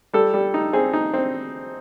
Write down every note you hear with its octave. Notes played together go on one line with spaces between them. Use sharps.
G3 A4
G3
D#4
C4 G#4
D#4
C4